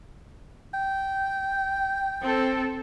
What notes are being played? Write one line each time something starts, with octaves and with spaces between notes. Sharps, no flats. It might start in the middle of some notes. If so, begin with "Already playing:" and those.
G5
C4 A4